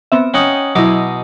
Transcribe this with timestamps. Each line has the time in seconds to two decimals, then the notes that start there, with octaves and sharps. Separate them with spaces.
0.12 B3 C4 E5
0.34 C#4 D#4 F#5 G5 D#6
0.75 B2 F#3 D#4 E4 D6